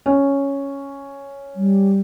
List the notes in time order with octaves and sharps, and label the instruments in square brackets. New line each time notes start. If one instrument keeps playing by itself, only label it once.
[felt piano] C#4
[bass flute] G3